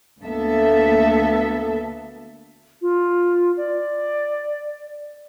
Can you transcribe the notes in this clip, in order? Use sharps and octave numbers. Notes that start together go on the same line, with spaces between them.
D2 A#3 B3 A4 E5
F4
D5